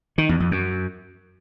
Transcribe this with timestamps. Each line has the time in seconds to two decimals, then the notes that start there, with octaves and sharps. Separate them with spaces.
0.18 D#3
0.29 E2
0.40 F2
0.51 F#2